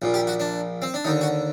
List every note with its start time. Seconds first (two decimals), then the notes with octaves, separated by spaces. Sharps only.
0.02 A#1 A#2
0.14 G4
0.27 F#4
0.40 D4
0.82 C4
0.94 D4
1.05 D#2 D3 D#4
1.21 F#4